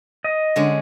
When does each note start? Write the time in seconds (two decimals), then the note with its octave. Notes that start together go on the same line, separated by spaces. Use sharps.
0.24 D#5
0.56 D3 G#3 C#4